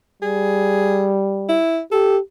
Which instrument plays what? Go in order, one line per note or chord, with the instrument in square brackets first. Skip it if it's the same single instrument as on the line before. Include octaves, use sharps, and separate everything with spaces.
[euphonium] G3 [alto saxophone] G#4
[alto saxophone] E4
[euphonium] G4 [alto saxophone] A4